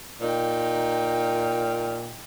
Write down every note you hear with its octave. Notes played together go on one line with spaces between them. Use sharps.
A#2 D#4 G5